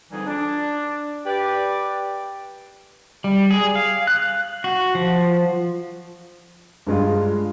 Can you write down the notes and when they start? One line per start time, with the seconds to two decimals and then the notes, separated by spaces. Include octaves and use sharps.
0.11 F2 D3 E3 G3 D#4 G#4
0.27 D4
1.26 G4 B4 D5
3.24 G3
3.51 G#4
3.75 F5
4.07 F#6
4.64 F#4
4.95 F3
6.87 G2 G#3 F4